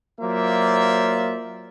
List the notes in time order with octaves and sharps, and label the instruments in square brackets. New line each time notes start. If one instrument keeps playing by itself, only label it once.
[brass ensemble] F#3 A#3 F4 C5 D5 E5